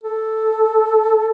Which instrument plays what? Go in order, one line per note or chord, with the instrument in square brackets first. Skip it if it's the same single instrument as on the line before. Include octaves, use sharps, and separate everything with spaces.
[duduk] A4